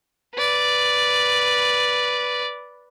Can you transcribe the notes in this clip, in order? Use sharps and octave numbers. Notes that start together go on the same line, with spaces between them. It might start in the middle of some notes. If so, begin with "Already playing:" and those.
B4 D5